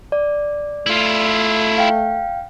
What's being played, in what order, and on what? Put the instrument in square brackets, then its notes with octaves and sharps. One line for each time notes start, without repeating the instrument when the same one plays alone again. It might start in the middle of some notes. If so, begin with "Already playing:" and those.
[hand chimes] D5
[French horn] A3 [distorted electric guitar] E4 F4
[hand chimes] F5 G5